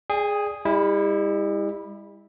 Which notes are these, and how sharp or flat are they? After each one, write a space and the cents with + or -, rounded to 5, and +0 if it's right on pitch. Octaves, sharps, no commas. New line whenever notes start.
G#4 +0 D5 +0 G5 +45
G3 +45 E4 -15